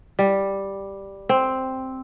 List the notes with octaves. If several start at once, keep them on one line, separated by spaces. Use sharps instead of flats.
G3
C4